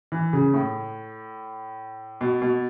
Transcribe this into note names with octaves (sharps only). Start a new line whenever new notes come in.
E3
C#3
A2
B2
B2